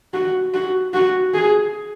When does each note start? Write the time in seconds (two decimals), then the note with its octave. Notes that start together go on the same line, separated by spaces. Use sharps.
0.13 F#4
0.54 F#4
0.94 F#4
1.34 G#4